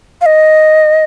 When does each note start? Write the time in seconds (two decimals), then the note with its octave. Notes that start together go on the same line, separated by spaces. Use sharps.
0.21 F5
0.26 D#5